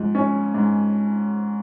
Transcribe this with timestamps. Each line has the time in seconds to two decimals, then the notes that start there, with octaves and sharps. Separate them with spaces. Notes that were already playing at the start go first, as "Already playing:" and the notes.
Already playing: G#2 F3
0.15 C#4
0.54 G#2